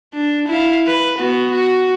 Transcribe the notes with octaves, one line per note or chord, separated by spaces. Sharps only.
D4
E4 F5
B4
B3 F#4
F#4